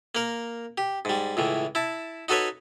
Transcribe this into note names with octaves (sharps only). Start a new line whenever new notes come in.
A#3 A#4
G4
G#2 G3
C#2 A2 E3
E4 A5
D#4 F#4 A4 B4 C#5